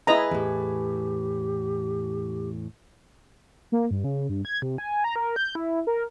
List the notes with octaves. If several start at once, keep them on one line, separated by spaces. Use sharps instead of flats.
E4 G#4 B4 D#5 A#5
E2 A2 G4
A#3
G2
C#3
G2
G#6
C3
G#5
A#5
A#4
G6
E4
A#4